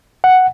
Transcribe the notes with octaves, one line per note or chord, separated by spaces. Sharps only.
F#5